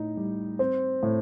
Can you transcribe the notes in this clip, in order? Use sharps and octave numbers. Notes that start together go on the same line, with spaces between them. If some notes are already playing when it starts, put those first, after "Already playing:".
Already playing: A2 D#4
G3
C4
A2